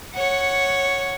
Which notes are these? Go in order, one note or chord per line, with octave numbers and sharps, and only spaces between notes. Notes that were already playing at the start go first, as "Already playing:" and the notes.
C#5 F#5